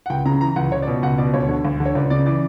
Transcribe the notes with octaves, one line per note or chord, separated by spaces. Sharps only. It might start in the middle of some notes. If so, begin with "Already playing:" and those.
F#5
C#2 G5
C#3 A#5
E3 A#5
C#2 F#5
C#2 C#5
D5
B2
C#2 F#5
B2 D5
D2 C#5
D3
D2
D3
C#5
C#2 D5
C#3 D5
E3 D5